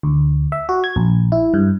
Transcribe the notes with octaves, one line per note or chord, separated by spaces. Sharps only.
D2
E5
F#4
G#6
A#1
E4
G2